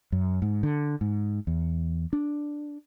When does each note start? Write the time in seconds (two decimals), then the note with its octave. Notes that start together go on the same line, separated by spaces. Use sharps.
0.12 F#2
0.42 G#2
0.63 D3
1.01 G#2
1.47 E2
2.13 D4